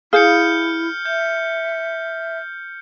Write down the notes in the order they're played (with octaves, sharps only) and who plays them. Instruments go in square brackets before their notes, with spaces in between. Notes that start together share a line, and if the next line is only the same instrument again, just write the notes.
[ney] E4 [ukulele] G#4 F5 [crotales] F6 G6 C#7
[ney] E5 [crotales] G6